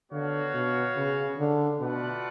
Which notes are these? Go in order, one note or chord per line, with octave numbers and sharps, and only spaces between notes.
D3 B3 F#4 C#5 F5
B2
C#3
D3
B2 A3 F4 B4 D5 F#5